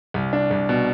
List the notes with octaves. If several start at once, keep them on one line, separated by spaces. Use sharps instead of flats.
C2
D4
C2
B2